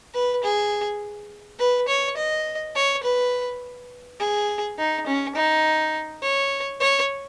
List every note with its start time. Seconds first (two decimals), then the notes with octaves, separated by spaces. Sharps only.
0.14 B4
0.43 G#4
1.59 B4
1.88 C#5
2.17 D#5
2.75 C#5
3.03 B4
4.20 G#4
4.78 D#4
5.07 C#4
5.35 D#4
6.22 C#5
6.80 C#5